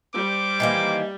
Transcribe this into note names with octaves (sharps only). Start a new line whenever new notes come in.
G3 C5 D6
D#3 E3 A#3